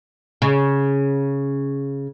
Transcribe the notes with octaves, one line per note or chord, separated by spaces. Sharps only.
C#3